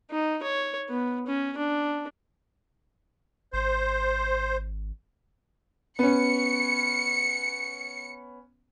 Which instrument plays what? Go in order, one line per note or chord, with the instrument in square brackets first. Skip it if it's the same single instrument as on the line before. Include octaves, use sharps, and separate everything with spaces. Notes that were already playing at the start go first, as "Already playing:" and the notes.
[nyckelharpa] D#4
C#5
B3
C#4
D4
[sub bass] G#1 [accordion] C5
[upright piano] B3 C#4 [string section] C#7